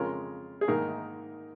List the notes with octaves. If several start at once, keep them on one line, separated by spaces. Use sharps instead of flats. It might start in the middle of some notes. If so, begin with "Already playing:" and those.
Already playing: F2 C#3 G#3 C#4 F4 A#4
G#4
G#2 D#3 A#3 D#4 A#4